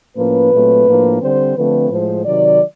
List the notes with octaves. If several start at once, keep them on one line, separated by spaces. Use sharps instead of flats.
A2 F3 A#3 C#4 B4
A#2 F#3 A3 C4
A2 F3 A#3 D4
D3 G3 C4 C5
D3 F3 A3 C4 B4
A2 F3 G#3 C5
C3 D#3 F#3 D5